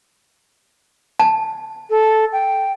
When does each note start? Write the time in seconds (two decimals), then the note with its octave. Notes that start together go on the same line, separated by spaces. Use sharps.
1.20 A5
1.90 A4
2.32 G5